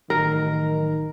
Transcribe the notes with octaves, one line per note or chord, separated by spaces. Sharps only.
A1 D#3 F#3 A#4